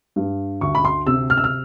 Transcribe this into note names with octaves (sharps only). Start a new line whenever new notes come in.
G2
D2 C#6
B5
C6
C3 E6
F6
E6
F6